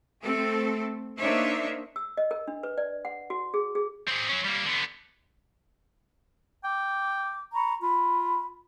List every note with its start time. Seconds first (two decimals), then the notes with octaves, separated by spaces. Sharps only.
0.22 A3 C4 A4
1.19 A#3 D4 D#4 C5 C#5 E5
1.96 E6
2.17 D#5
2.31 A#4
2.48 D4
2.63 B4
2.78 D5
3.05 F#5
3.30 F#4
3.54 G#4
3.75 G#4
4.08 C4 G#4
4.29 F#3 C#4
4.44 G3 A#3
4.66 D3 B3
6.64 G5 D6
7.53 A#5 B5 C#6
7.82 F4 B5